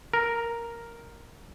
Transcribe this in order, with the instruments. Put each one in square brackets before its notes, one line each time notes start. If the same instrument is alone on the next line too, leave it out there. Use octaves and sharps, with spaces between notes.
[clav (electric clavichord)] A#4